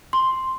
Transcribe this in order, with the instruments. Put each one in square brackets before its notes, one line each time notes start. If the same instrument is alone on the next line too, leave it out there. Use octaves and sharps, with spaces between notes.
[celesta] C6